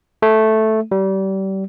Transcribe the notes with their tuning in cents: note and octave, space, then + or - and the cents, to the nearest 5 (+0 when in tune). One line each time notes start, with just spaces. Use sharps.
A3 -5
G3 -30